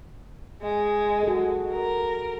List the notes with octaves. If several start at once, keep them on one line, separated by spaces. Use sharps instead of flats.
G#3
F#4 A4
A#4